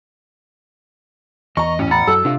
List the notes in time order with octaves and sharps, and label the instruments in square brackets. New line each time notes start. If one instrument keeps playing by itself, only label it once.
[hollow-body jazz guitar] E2 [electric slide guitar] D#5 [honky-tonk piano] A#5 C#6
[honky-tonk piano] A1 [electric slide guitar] C#4
[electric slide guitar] F#5 [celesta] A#5 B5 A6
[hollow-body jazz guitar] F#2 [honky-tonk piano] A4 [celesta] E6
[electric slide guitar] C3 [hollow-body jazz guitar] D4 F4 F5